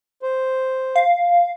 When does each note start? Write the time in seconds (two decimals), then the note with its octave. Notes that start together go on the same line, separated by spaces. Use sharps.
0.22 C5
0.95 F5